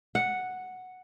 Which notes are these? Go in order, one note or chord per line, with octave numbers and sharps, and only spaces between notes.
F#5